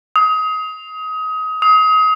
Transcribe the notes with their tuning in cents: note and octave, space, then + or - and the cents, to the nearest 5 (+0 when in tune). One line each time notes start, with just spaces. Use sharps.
D#6 +25
D#6 +30